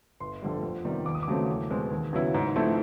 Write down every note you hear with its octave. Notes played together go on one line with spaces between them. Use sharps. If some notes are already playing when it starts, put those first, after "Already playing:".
G1 C6
F2 D3 G3
F2
C3 D#3 G3 B3
D#2 D6
D#6
D6
C#3 F#3 A3 C4
E2
B2 G#3 C4
D#2
C#3 F#3 B3 E4
G#2
F3 A3 C4 E4